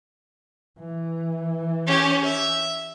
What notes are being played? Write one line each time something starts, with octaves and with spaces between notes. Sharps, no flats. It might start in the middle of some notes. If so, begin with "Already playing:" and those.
E3
C#4 G4
E5